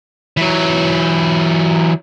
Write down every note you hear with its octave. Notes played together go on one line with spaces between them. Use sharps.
E3 F#3